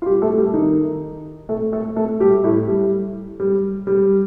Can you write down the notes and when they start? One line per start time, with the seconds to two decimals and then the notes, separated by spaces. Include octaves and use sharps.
0.02 F4
0.06 G3 G4
0.22 A3 A4
0.37 G3 G4
0.53 D#3 D#4
1.49 A3 A4
1.72 A3 A4
1.96 A3 A4
2.20 G3 G4
2.44 A2 A3
2.68 G3
3.40 G3
3.87 G3